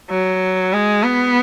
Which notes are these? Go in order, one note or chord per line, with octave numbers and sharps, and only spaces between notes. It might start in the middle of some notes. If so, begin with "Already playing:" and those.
F#3
G#3
B3